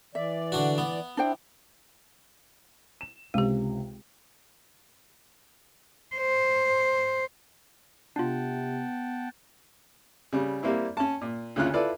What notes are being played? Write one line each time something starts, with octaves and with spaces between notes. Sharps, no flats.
E3 D5 E5
D3 D4 F#4
B3
D4 E4 C5 G5
E7
C#2 C3 G#3 G4
C5
C3 B3 D4 F4 F#5 G5 A5
C#3 G3
G3 A#3 C4 E4
C#4 A5
A#2
D2 C#3 C#4 F4 F#6
E4 F4 A4 B4 D5